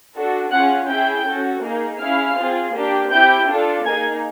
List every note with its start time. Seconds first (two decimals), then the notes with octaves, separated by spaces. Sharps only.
0.15 D4 F#4 A4
0.51 C#4 F4 G#4 F#5 F#6
0.88 C#4 E4 G#4 G5 G6
1.25 C#4 F#4 A4
1.62 A#3 D#4 G#4
2.00 C#4 E4 G#4 F5 F6
2.37 C4 F4 G#4
2.74 A#3 D4 G4
3.10 C4 E4 G4 G5 G6
3.48 D4 F4 A4
3.85 A#3 D#4 G#4 G#5 G#6